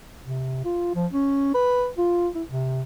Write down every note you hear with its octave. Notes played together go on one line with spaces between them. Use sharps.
C3
F4
F3
C#4
B4
F4
E4
C3